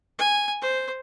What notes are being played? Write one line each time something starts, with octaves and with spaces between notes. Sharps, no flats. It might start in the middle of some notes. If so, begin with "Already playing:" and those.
G#5
C5